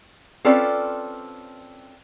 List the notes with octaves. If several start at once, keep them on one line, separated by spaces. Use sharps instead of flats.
C4 C#4 F4 A4 B4 D5